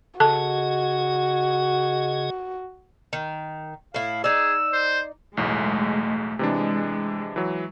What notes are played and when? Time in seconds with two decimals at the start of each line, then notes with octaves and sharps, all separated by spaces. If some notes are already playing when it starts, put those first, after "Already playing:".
0.20 C#3 F#4 G#4 A4 D#5 A5
3.13 D#3
3.94 A2 E4 F5
4.24 D#4 G#4 D5 E6
4.73 C5
5.37 B1 E2 A2 G#3 A3
6.39 C3 E3 G#3 D4
7.36 E3 F#3